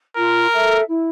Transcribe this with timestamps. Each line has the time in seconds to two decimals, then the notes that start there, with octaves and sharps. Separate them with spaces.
0.17 F4 A#4
0.52 A4 E5
0.88 E4